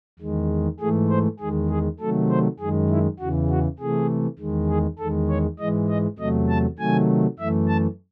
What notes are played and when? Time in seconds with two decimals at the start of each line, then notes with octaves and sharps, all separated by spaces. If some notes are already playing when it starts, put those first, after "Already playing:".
0.19 E2 D#3 G#3
0.80 G#2 E3 A3 G#4
1.10 C5
1.40 E2 D#3 G#3 G#4
1.70 G#4
2.00 C3 D#3 F#3 A3 A4
2.30 C5
2.59 F#2 D#3 G#3 G#4
2.90 E4
3.19 E2 C#3 E3 F#4
3.50 F#4
3.79 C3 E3 A3 G#4
4.39 E2 D#3 G#3
4.69 G#4
4.98 E2 D#3 G#3 A4
5.29 C#5
5.59 G#2 E3 G#3 D#5
5.89 D#5
6.19 E2 C3 F#3 A3 D#5
6.49 A5
6.79 C3 D#3 F#3 A3 G#5
7.39 F#2 E3 A3 E5
7.68 A5